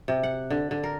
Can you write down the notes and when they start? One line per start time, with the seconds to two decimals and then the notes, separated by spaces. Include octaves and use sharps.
0.08 C3
0.23 F#5
0.50 D3
0.71 D3
0.83 A#4